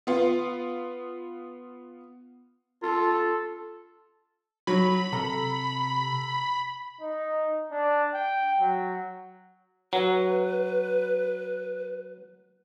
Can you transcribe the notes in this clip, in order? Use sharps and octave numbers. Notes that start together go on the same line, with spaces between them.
B3 F4
F4 A4
F#3 B5
C3 A4 A#5
D#4
D4
G5
F#3
F#3 B4